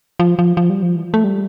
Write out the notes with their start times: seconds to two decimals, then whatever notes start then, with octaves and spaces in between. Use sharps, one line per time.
0.20 F3
0.39 F3
0.57 F3
0.70 G3
0.83 F3
0.95 E3
1.04 F3
1.14 A3
1.24 G3